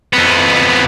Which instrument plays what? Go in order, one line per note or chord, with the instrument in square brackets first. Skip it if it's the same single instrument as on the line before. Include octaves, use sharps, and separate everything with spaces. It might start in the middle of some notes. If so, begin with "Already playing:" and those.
[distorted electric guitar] F2 B3